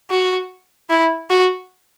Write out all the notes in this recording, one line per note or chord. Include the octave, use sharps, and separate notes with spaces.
F#4
E4
F#4